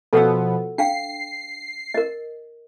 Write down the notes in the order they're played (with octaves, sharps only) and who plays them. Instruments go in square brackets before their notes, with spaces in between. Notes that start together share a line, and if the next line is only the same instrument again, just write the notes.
[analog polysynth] B2 F3 B3 [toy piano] A4 F#5 E6
[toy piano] D4 F5 G5 [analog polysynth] C7
[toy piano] A#4 D#5